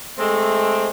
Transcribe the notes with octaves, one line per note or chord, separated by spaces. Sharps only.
G#3 A3 C4